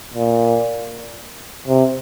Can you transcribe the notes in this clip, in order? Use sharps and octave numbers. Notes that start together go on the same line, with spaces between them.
A#2
C3